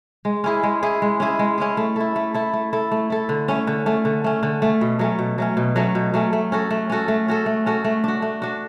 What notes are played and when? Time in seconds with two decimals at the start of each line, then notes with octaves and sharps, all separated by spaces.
0.25 G#3
0.44 C#4 E4 G#4
0.63 G#3
0.83 C#4 E4 G#4
1.02 G#3
1.20 C#4 E4 G#4
1.39 G#3
1.58 C#4 E4 G#4
1.77 A3
1.96 E4 A4
2.16 A3
2.34 E4 A4
2.53 A3
2.73 E4 A4
2.92 A3
3.10 E4 A4
3.29 D3
3.48 A3 C#4
3.67 D3
3.86 A3 C#4
4.05 D3
4.24 A3 C#4
4.43 D3
4.62 A3 C#4
4.81 B2
4.99 F#3 A3 C#4
5.19 B2
5.38 F#3 A3 C#4
5.57 B2
5.76 F#3 A3 C#4
5.95 B2
6.14 F#3 A3 C#4
6.33 A3
6.52 C#4 F#4 A4
6.71 A3
6.90 C#4 F#4 A4
7.08 A3
7.28 C#4 F#4 A4
7.46 A3
7.66 C#4 F#4 A4
7.84 A3
8.04 D4 F#4
8.22 A3
8.42 D4 F#4